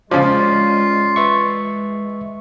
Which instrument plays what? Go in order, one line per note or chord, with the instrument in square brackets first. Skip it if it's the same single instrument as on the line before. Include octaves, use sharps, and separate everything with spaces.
[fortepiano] C#3 F3 [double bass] G#3 C#4 [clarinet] F4 [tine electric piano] D5
[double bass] G#3 [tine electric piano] B4 E5 C#6